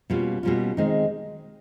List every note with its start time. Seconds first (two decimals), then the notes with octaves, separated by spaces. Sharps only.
0.10 B2 G3 A#3 C#4 F4
0.43 B2 G3 A#3 C#4 F4
0.77 D#3 G#3 C4 D#4